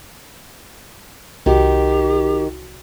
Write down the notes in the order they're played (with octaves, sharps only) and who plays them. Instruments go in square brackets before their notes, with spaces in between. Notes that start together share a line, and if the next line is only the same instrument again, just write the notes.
[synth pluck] C2 F#4 [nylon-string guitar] D#3 [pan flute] G4